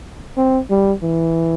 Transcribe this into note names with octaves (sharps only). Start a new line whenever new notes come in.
C4
G3
E3